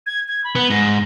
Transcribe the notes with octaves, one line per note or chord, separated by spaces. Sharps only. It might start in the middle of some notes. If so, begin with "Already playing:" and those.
G#6
G#6
B5
B3
G#2 A#6